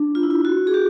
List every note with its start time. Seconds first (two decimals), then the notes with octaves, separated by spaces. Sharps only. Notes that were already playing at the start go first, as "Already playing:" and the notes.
Already playing: D4
0.15 F4
0.23 E4
0.30 F4
0.45 F#4
0.67 G#4
0.74 G4